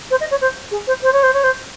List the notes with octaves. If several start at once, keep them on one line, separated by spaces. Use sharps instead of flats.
C5
D#5
C#5
C5
G#4
C5
C5
C#5
C5
C#5
C5